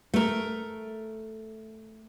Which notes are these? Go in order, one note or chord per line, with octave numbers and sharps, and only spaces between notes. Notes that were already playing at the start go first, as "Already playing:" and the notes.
A3 A#4